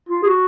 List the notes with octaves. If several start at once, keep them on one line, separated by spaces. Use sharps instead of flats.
F4
G#4
F#4